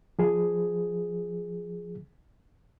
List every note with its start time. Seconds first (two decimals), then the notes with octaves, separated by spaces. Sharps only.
0.19 F3 G#4